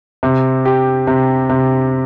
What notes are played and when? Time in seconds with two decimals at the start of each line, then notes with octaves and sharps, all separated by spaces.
0.23 C3
0.65 G4
1.07 C3
1.49 C3